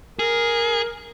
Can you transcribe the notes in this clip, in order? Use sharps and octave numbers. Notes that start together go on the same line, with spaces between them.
G#4 A#4